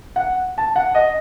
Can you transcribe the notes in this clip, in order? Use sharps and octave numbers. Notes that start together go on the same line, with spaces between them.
F#5
A5
F#5
D#5